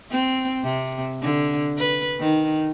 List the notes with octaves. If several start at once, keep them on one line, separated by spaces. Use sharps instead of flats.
C4
C3
D3
B4
D#3